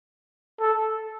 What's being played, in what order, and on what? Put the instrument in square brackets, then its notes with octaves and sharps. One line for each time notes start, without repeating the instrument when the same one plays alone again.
[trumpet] A4